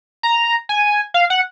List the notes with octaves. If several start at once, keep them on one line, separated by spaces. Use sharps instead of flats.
A#5
G#5
F5
F#5